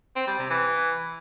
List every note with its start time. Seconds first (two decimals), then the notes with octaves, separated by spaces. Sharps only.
0.16 C4
0.27 G3
0.39 C3
0.50 E3